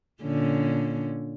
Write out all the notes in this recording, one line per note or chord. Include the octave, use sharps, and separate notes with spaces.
A#2 D3 C#4